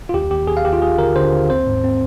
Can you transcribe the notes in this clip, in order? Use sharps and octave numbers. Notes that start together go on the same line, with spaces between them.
F4
D#2 G4
D#2 G4
D#2 G#4
F5
D#2 G4
F4
D#2 G#4
D3 A#4
D3 C5
D#2
C4 C5
G#2
C4